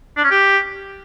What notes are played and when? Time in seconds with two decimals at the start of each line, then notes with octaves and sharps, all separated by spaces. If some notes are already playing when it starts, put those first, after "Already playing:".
0.17 D4
0.24 C#4
0.31 G4